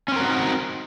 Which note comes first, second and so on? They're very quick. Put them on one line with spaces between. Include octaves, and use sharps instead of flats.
C#4 C4 A#4 F#4 D#4